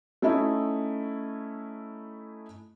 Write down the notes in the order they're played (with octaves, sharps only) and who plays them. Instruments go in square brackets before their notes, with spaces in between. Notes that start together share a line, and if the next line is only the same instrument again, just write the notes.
[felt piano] A3 C#4 D#4 E4